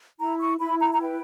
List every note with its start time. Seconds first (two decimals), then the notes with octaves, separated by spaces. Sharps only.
0.20 E4 A#5
0.40 C#6
0.60 E4 B5
0.81 A#5
0.93 A#5
1.00 B4 G5